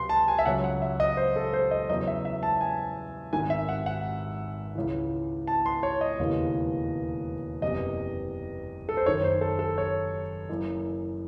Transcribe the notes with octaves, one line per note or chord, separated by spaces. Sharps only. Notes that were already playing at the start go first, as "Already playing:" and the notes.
Already playing: C#2 C3 F#3 C6
A5
G#5
E5
C#2 C#3 F#3 F#5
F#5
E5
D#5
C5
A4
C5
D#5
E2 C#3 F#3 D#5
E5
E5
A5
G#5
G#1 G#2 D#3 G#5
E5
F#5
F#5
C#2 C#3 E3
A5
C6
C#5
D#5
E1 D#2 C#3 E3
F#1 E2 C3 D#5
A4
C5
F#1 F#2 D#3 C#5
C5
A4
A4
C#5
F#1 F#2 E3